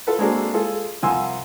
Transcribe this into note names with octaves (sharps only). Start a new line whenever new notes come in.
F4 A4 B4
G#3 A#3 C4 D4 F#4 A4
G#3 F4 G#4 A4
C2 F3 F#5 G#5 C6 E6